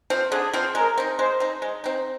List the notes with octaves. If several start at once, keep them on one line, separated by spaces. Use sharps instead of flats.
F3 C4
D3 G#4
F3 C4
G#3 A#4
C4 D#4
G#3 C5
C4 D#4
G#3
C4 D#4